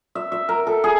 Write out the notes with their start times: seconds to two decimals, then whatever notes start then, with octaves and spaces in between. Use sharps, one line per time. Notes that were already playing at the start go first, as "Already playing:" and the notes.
0.15 E5
0.32 E5
0.49 A#4
0.67 A4
0.84 G#4